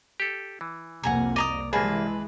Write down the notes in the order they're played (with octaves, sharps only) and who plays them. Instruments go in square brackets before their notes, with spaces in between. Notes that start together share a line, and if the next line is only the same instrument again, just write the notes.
[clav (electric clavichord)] G4 A4
E3
[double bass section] C2 F2 A#3 [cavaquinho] F#5 G#5 A#5
[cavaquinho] D5 A#5 D#6 [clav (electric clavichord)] D#5
[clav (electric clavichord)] C2 A#3 [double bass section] E3 G#3 [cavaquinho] G#4 B4 A5